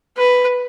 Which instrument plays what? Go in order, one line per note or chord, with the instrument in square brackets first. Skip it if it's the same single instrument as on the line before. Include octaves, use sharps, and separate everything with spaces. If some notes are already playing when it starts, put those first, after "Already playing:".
[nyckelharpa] B4